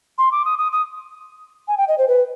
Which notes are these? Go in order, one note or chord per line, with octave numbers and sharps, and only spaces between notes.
C6
D6
D#6
D#6
D#6
G#5
G5
D#5
C5
B4